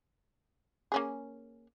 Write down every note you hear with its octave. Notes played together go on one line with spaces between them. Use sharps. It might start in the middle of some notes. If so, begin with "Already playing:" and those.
A#3 C#4 G#4